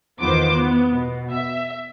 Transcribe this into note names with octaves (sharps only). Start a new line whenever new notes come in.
E2 D#3 B3 F4 C5 D6
B3
B2
E5